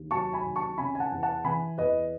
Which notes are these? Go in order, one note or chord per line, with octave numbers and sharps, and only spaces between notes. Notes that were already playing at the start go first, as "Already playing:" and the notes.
Already playing: D#2
F#3 A5 C#6
G#5 B5
D#2
A5 C#6
C#3 G#5 B5
G#5
F#5 A5
E2
F#5 A5
E3 G#5 B5
E2 B4 D#5